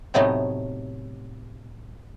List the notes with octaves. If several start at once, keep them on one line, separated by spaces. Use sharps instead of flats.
A2 C3 F#3 A3 B3 D#4